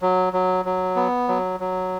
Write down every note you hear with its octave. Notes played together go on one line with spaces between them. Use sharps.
F#3
F#3
F#3
B3
F#3
F#3